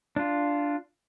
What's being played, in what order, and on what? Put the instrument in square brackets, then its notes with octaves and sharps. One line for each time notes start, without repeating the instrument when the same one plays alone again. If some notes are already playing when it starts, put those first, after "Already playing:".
[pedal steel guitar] D4 F4